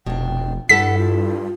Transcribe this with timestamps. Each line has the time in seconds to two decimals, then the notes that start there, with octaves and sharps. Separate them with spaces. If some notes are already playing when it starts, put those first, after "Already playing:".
0.06 F1 B2 D4 G5
0.69 G2 E4 A4 F#5 A5 B6
0.98 F4